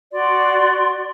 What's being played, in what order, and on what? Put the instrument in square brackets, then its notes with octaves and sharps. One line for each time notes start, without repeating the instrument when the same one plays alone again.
[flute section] F#4 D5 C6